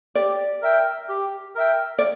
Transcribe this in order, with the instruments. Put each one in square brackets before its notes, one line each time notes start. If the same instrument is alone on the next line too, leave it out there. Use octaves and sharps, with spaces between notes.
[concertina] G4 [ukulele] D5
[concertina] A#4 E5 G5
G4
A#4 E5 G5
[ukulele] D5